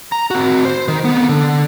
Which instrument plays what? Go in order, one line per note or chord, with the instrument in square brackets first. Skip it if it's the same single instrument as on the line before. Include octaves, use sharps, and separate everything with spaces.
[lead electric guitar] A#5
C4 F#4
C5
D#3
A#3 B3
D3